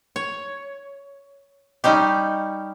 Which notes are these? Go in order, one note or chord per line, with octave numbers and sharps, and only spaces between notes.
C#5
G3 C#4 D#4 G4